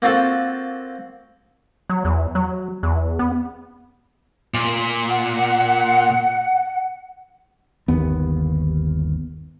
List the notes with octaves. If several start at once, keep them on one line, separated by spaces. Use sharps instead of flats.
A#3 C4 F4 F#4 A4
F#3
E2
F#3
E2
B3
A#2
F#5
G1 D#2 B3